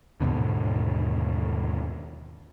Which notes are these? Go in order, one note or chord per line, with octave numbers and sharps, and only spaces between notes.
D#2 G#2 B2 D3